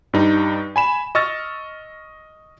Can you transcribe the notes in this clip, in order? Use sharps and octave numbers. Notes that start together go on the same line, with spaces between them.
G2 G3 D#4
G#5 B5 E7
D#5 C#6 E6 F6 A6